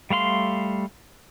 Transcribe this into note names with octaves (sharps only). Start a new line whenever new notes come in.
G3 A3 F5 C6